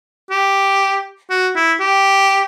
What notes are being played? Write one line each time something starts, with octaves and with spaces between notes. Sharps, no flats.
G4
F#4
E4
G4